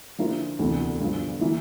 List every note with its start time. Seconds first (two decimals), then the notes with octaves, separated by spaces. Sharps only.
0.18 D3 F3 A#3 E4 A#4
0.59 E1 D2 C3 E3
1.00 G2 D3 F3
1.41 E3 A#3 E4